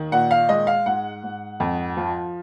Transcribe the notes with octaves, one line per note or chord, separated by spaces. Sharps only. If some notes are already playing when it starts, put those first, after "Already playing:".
Already playing: D#2 D#3
A#2 F#5
F5
G#3 D#5
F5
G#2 F#5
G#2
F2
F3